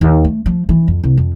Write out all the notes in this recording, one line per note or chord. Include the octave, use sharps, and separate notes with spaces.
D#2
A3
F3
E3
F2
C2
F2